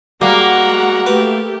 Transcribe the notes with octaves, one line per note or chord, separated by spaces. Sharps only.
G3 G#3 A#3 F#4 F#5 A#5
A3 G4 B4